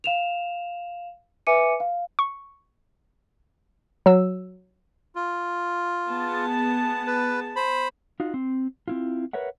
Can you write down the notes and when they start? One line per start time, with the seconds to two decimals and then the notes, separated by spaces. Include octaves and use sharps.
0.04 F5 E7 F7
1.47 B4 E5 G#5 D6 C#7 D#7
1.80 F5
2.19 C#6
4.06 F#3 E6
5.15 F4
6.09 B3 G#4 A5
7.07 B4
7.56 C5 B5
8.20 D#4 F4 F#4
8.34 C4
8.88 C4 E4 F4
9.33 A#4 B4 C#5 E5 F#5